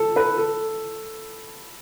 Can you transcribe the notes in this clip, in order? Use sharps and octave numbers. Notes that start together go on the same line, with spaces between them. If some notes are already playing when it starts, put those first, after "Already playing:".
Already playing: A4
B4
A4